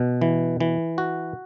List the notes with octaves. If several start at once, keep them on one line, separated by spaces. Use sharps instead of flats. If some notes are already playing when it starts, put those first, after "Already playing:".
Already playing: B2
E3
E3
F#4